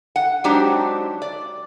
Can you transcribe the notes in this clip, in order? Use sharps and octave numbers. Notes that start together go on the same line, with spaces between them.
F#5
F#3 G#3 C4 D4 D#4 G4
D5